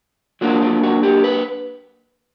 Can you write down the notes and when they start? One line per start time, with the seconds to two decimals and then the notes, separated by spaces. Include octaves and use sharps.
0.41 F#3 A#3 D4 F4 F#4
0.62 F4
0.83 F#4
1.03 G4
1.24 B4